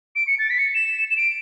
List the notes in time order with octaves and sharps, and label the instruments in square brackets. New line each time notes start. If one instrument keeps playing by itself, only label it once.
[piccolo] D7
C#7
A6
B6
C#7
E7
E7
D7